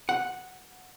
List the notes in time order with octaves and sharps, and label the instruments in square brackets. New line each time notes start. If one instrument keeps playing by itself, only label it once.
[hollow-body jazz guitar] F#5